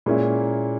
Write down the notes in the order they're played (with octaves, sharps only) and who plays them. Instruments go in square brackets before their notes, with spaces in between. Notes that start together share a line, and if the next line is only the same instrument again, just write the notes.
[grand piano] A#2 A#3 C#4 E4 [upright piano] G#3